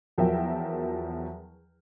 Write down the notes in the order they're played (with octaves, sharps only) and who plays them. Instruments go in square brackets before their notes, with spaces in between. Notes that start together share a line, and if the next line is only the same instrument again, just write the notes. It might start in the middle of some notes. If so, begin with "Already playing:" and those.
[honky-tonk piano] E2 F3 F#3 A#4 E5 G5